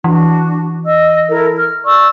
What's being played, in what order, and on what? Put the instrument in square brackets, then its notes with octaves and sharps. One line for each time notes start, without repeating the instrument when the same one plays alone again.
[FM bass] E3 [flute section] D4 F#4
[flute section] D#5 E6
E4 A4 A#4
F6
D5 C#6 E6